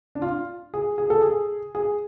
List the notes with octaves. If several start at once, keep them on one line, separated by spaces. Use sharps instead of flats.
D4
F4
G#4
G#4
A4
G#4
G#4